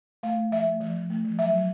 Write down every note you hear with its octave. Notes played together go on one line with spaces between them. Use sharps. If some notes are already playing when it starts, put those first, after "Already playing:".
A3 F5
A3
F3 E5
A3
F3
F3
A3
F3
F#3 E5
F#3